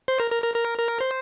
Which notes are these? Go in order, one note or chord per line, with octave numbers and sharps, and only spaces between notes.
C5
A#4
A#4
A#4
A#4
A#4
C5